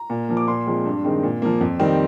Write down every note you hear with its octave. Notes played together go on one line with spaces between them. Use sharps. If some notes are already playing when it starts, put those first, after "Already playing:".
Already playing: A#5
A#2
F3 A#3
D6
A#2 C6
F3 G#3 C4
G2
D#3 G#3 C4
A#2
F3 A#3
F2
D#3 G3 C4